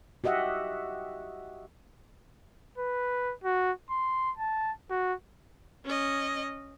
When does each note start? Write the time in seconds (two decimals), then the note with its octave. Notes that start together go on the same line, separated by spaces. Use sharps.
0.24 F#4 G4 D#5 E5 F#5
2.78 B4
3.44 F#4
3.90 C6
4.37 A5
4.90 F#4
5.85 C#4 D#5